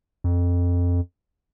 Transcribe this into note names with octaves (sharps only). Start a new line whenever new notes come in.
F2